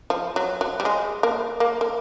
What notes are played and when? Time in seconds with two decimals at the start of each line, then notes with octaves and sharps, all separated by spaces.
0.10 F3
0.36 F#3
0.61 F#3
0.80 G3
0.85 G#3
1.23 A#3
1.60 A#3
1.81 A#3